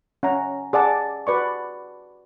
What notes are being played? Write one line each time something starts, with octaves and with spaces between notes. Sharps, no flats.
C#4 F#5 A#5
G#4 D5 F#5 A5
F#4 B4 D5 C#6